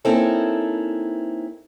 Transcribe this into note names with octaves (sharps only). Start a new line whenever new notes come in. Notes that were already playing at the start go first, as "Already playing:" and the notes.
A#3 C4 C#4 D#4 E4 A4